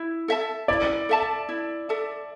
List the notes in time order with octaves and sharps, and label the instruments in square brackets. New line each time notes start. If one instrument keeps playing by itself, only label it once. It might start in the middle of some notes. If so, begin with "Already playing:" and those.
Already playing: [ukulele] E4
A4 E5 A5
[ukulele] E4 [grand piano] D5
[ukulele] A4 E5 A5
E4
A4 E5 A5